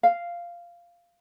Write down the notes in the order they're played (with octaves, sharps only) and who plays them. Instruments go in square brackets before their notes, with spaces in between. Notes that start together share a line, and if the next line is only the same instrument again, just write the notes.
[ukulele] F5